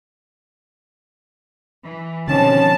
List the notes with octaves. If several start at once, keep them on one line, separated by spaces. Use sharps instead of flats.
E3
B2 D3 D#3 F3 G3 C4 C#4 A5